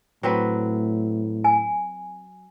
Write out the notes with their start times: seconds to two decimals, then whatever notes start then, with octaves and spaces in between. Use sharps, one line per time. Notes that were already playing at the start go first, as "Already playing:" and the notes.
0.23 A2 F#3 C4 B4
1.44 G#5